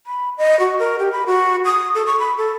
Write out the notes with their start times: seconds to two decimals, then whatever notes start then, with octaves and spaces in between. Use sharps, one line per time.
0.07 B5
0.38 D#5
0.60 F#4
0.79 A#4
0.99 G4
1.12 B5
1.26 F#4
1.65 D#6
1.95 A4
2.06 C#6
2.19 B5
2.38 A4